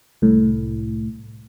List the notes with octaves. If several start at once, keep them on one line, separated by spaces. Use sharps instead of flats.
C2 A2